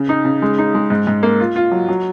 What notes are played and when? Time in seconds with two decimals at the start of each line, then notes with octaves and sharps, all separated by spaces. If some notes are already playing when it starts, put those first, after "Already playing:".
Already playing: C#3
0.09 D#4
0.25 C#3
0.42 G#3
0.58 D#4
0.75 G#3
0.90 G#2
1.07 G#2
1.23 A#3
1.40 F4
1.56 F4
1.72 F#3
1.89 F#3